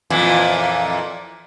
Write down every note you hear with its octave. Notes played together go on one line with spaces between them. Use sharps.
F2 A#2 E3